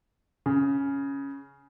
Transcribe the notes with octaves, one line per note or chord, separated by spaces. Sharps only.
C#3